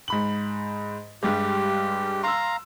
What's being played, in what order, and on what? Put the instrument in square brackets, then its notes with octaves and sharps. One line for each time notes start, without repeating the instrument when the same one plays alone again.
[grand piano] G#2 B5 F#7
[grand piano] G2 G3 G#3 [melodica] G4
[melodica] F5 A#5 [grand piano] C6 E6